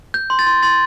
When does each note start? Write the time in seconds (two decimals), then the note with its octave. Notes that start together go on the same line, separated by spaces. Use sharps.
0.14 G6
0.30 C6
0.39 A6
0.47 C6
0.63 C6 A6